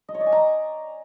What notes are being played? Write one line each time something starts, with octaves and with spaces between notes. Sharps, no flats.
D#5
C#5
D5
G#5
A#5